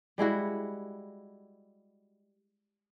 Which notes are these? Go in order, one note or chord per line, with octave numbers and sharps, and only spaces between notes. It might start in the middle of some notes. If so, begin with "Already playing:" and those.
G3 G#3 E4 F#4